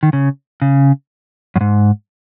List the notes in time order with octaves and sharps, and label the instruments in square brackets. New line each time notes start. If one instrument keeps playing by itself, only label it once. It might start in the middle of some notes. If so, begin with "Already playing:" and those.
[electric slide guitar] D#3
C#3
C#3
F#2
G#2